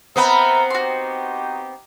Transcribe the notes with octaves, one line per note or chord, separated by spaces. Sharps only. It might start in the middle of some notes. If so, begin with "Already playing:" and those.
B3 C4 A#4 D#5 E5 A#5 B5
D#4 F#4 G4 C6